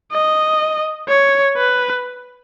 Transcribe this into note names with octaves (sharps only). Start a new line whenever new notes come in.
D#5
C#5
B4